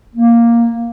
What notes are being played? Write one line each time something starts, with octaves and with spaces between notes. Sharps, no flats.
A#3